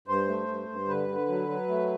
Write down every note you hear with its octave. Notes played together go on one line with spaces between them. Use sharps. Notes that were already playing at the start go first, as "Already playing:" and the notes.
G2 C5
A3
G2
G2
D3 B4
D3
F#3
F#3
A3